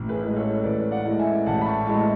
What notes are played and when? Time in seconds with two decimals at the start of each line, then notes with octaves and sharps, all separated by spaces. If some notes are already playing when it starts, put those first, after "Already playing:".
Already playing: A1
0.09 G#4 B4
0.23 A2 G#3
0.36 A4 C#5
0.64 A1 B4 D5
0.91 D5 F#5
1.05 A2 G#3
1.19 E5 G#5
1.46 A1 F#5 A5
1.61 B5
1.66 A5 C#6
1.86 A2 G#3 A5 C#6